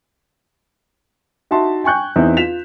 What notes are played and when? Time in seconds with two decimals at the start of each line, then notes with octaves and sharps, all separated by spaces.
1.51 D#4 F#4 E5 A5 C6
1.84 G5 G#5 C#6 F#6 G6
2.16 E2 C4 D#4 E5
2.37 F4 B6 E7 F7